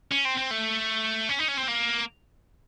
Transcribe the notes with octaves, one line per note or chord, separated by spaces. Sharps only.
C#4
C4
C4
A3
C#4
D#4
C#4
C4
A#3